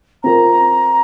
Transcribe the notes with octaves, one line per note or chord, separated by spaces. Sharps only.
C4 F4 A#4 A#5